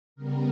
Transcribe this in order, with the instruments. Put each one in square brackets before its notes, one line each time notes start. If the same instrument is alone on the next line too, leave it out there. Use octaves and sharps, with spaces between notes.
[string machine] C#3 G3 B3 A#4